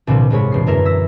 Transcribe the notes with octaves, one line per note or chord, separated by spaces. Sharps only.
C2 A#2 D3 F3 C4
C2 G#2 G#3 C4 C#5 B5
E1 C7
F#2 D3 E4 A#4 E7
E6 A#6 B6